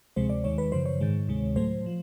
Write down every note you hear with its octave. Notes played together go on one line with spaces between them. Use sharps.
D2 C3 F3 G#3 C5
D5
D#2 D#3 G#3 C#5
B4
F#2 C#3 F3 C5
C#5
G#2 D#3 G#3
D2 C3 D#3 G#3
A2 F#3 A3 C5
F3